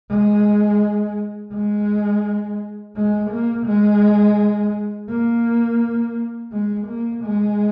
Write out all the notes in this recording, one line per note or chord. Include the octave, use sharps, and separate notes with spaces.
G#3
G#3
G#3
A#3
G#3
A#3
G#3
A#3
G#3